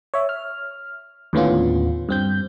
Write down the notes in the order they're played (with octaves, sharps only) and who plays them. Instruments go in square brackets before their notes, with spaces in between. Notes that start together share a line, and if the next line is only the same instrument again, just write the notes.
[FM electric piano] C#5 E5
F6
D#2 A2 D3 B3 C#4 F4
G2 C4 G6